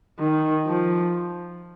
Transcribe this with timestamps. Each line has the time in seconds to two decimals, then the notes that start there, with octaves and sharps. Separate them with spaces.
0.19 D#3
0.67 F3